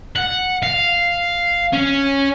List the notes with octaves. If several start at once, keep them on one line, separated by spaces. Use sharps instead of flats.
F#5
F5
C#4